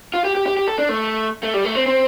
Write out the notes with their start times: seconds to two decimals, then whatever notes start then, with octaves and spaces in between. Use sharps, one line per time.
0.14 F4
0.25 G4
0.35 G4
0.46 G4
0.57 G4
0.68 A4
0.78 D4
0.89 A3
1.43 A3
1.54 G3
1.65 A3
1.75 C4
1.86 C4